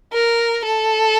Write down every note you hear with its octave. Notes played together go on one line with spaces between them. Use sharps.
A#4
A4